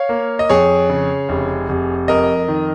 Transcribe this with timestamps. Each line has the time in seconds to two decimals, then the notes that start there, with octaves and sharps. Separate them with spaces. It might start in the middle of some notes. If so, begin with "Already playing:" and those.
Already playing: C#5 F5
0.09 A#3
0.39 D#5
0.49 F2 G#4 C#5
0.90 C#3
1.29 F1
1.69 F1
2.08 F2 A#4 D#5
2.48 D#3